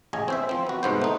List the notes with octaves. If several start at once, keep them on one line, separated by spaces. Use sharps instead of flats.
A1 C#3 C#4 D#5 G#5
C4 C5 E5
F3 C4
B3 F#4
C2 G#2 B3 C5
A3 D#4